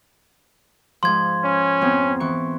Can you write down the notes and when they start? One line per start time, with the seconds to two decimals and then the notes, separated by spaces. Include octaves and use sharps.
1.03 G#2 F3 C6 G#6
1.44 C#4
1.81 F2 B3 C4
2.20 E3 C#6